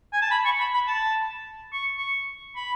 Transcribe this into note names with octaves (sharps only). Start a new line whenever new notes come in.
G#5
A5
B5
C#6
B5
B5
A5
C#6
C#6
B5